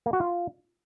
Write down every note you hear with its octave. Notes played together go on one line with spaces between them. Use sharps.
A#3
F#4
F4